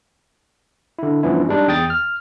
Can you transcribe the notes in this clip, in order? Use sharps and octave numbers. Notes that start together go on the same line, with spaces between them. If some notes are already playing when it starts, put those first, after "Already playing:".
D3 E4
G2 E3 F3 B3 C#4 E4
G3 G#3 D4 D#4
E2 G5 D#6 A6
F6